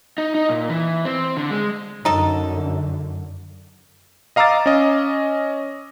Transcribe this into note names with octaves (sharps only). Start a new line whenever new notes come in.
D#4
D#4
A#2
E3
C4
D3
G#3
F#2 D3 D#4 A4
D#5 F5 A#5 D6 E6 A6
C#4 D#5